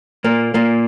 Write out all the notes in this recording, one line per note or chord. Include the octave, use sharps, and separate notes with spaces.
A#2 A#3
A#2 A#3